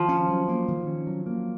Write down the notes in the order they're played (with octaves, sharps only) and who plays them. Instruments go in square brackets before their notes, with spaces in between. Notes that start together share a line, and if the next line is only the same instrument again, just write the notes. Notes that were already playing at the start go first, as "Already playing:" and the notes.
Already playing: [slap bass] D#3 [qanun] F3
[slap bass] C#4
F#3
A#3
D#3
C#4
F#3
A#3